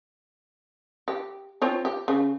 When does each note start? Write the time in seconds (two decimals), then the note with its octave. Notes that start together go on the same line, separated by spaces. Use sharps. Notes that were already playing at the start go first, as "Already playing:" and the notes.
1.08 G4
1.62 C4 F4 C#5
1.85 G4
2.08 C#3